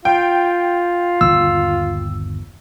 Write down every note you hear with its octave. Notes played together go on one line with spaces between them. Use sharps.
F4 G5
G1 D#2 E6